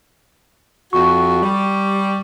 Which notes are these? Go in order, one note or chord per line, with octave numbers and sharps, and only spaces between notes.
F2 F#4 C#6
G3